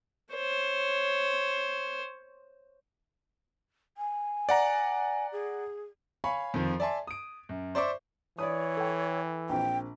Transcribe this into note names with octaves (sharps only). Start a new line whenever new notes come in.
C5 C#5
G#5
D5 F#5 A#5
G#4
C#5 F5 G#5 B5 C#6
F2 D#3 F3
D5 E5 G#5 A5 C6
D#6 D7
F#2
C5 D5 E5 C#6 D6
E3 C#5 D5 B5 D#6
A4 G5
A#1 C4 G5